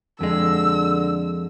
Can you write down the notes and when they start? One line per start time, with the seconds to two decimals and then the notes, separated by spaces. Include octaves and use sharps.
0.21 F2 D3 G#3 E6